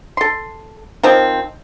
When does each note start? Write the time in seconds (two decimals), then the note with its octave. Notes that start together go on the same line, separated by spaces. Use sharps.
0.17 A4 C6
1.03 D#3 F3 C4